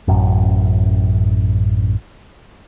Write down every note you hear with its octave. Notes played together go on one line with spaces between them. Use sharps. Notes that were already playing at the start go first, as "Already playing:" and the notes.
A1 F#2